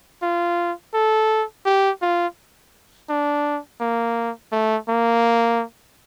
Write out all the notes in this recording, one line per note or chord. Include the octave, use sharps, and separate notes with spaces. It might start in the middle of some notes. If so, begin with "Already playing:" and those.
F4
A4
G4
F4
D4
A#3
A3
A#3